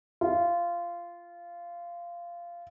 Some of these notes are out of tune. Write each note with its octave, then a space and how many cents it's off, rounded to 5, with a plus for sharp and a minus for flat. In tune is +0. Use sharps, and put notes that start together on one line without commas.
F4 -15